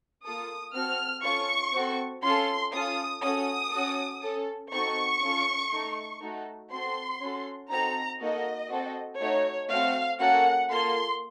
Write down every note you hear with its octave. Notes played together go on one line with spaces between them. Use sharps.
A#3 F4 A4 D#6
C4 F#4 A4 F6
C#4 F4 A4 C#6
C4 F#4 A4
C#4 F4 A4 C6
C#4 F4 A4 D#6
C#4 F#4 A4 D#6
C#4 F#4 A4
C#4 A4
C4 D#4 F#4 A4 C#6
C#4 F4 A4
A3 D#4 A4
A3 D#4 F#4 A4
C4 F#4 A4 C6
C#4 F#4 A4
C4 D#4 F#4 A4 A#5
A#3 D#4 F#4 A4 D#5
C4 F#4 A4
A3 D#4 F#4 C#5
A3 C4 F#4 F5
A#3 C#4 F#4 A4 F#5
A#3 F4 A4 C6